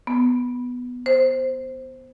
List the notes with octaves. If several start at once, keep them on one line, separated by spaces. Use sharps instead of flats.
B3
C5